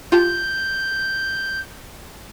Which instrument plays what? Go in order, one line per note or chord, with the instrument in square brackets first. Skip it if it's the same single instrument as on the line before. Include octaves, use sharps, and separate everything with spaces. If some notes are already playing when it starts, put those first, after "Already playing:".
[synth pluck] F4 G4 A5 [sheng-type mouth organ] G6